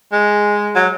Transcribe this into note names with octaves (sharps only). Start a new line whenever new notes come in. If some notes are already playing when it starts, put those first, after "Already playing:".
G#3
F#3